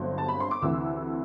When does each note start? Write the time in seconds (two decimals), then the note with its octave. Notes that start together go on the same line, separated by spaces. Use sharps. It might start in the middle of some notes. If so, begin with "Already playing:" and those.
Already playing: G1 G2 F#3 C4
0.18 A5
0.28 B5
0.40 C6
0.51 D6
0.62 D2 C3 E3 E6